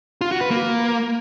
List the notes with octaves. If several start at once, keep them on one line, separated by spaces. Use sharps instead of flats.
F4
F#4
B4
A#3